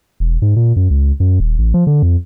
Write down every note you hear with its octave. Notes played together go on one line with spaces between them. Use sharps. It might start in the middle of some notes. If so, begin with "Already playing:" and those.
E1
G#2
A#2
F#2
C#2
F#2
D#1
A1
F3
D3
F2